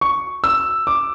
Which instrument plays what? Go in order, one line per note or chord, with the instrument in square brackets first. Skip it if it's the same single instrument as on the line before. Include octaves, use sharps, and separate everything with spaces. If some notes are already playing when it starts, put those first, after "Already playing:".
[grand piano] C#6
E6
D6